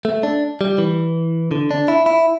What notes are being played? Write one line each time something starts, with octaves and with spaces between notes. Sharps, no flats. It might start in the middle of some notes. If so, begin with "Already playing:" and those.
A3
D4
G3
E3
D3
D4
E4
E4